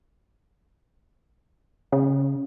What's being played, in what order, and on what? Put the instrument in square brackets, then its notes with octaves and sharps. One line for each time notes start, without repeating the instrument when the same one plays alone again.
[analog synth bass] C#3